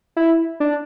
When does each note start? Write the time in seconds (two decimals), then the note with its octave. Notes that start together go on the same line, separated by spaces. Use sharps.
0.16 E4
0.60 D4